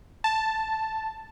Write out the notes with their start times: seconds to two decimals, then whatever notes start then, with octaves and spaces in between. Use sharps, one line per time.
0.24 A5